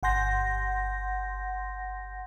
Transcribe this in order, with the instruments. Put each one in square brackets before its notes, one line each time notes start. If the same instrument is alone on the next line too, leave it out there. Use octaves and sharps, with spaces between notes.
[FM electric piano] G1 F#5 G#5 C6 G6 A#6